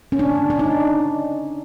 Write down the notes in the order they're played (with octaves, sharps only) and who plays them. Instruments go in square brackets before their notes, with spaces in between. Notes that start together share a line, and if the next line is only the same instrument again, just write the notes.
[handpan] C#4
D4
D4
D#4